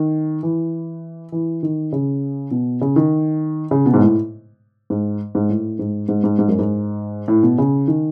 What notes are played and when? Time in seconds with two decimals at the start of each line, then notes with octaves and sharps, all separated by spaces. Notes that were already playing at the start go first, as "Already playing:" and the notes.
Already playing: D#3
0.43 E3
1.32 E3
1.63 D#3
1.92 C#3
2.51 B2
2.81 C#3
2.96 D#3
3.71 C#3
3.86 B2
3.94 G#2
4.00 A2
4.90 G#2
5.35 G#2
5.49 A2
5.79 G#2
6.09 G#2
6.24 G#2
6.39 G#2
6.48 F#2
6.59 G#2
7.28 A2
7.43 B2
7.58 C#3
7.88 D#3